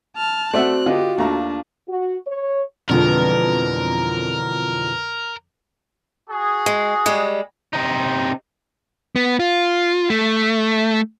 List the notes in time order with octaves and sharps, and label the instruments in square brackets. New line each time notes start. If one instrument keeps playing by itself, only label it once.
[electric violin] A5 F6
[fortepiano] A3 E5 F#5 [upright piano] C4 D5 [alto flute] F#4 [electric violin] F#6
[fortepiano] D3 B3 [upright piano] F4 D#5 [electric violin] G4
[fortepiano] D#2 A3 A#5 [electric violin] D4
[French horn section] F#4
C#5
[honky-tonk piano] F2 D3 F3 [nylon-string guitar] B2 E3 G#3 [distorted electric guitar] A#4
[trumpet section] F#4 G#4
[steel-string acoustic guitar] G#3
G3 G#3
[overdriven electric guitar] C3 D#4
[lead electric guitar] B3
F4
A3